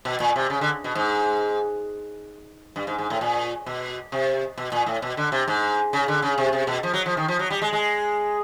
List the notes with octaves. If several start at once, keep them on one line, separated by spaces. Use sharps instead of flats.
B2
A#2
C3
C#3
D3
B2
G#2
G2
G#2
G#2
A2
A#2
B2
C3
B2
A#2
A2
B2
D3
C3
G#2
C#3
D3
C#3
C3
C3
B2
F3
F#3
F3
D#3
F3
F#3
G3
G#3
G#3